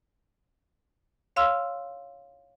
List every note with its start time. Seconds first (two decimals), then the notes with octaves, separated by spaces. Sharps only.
1.36 C#5 F5 C6 E6 F6